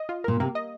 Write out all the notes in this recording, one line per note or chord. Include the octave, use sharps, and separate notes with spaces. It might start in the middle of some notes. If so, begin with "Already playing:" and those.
Already playing: D#5
F4
A#2 A#4
C3 A#3
D#5